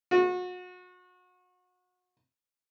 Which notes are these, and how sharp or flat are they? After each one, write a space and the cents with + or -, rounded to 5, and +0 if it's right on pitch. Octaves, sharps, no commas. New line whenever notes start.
F#4 -35